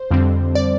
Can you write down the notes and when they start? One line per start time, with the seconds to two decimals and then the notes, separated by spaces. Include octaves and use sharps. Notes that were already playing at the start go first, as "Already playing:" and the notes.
Already playing: C5
0.11 F2 D3 G3 C4
0.55 D5